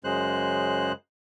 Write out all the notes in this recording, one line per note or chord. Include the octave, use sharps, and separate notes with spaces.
F#2 C#3 G#3 C5 F#6